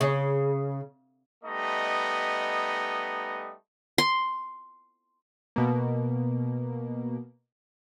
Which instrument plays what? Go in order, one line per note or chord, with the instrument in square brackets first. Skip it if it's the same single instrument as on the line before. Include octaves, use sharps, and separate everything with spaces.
[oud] C#3
[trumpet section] G3 A3 B3 D#4 D#5
[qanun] C6
[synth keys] B2 A#3